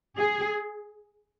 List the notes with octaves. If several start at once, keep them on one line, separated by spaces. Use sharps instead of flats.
G#4